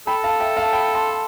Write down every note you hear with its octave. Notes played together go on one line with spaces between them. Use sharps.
A4 G5 B5
F5 A5
E5 G5
F5 A5
G5 B5
A5 C6